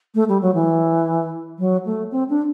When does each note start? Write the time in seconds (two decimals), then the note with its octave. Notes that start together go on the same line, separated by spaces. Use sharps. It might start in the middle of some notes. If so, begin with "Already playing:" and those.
0.15 A3
0.29 G3
0.42 F#3
0.54 E3
1.59 F#3
1.85 A3
2.11 C4
2.29 D4